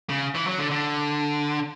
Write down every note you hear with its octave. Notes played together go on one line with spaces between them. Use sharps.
C#3
E3
F#3
D3
D3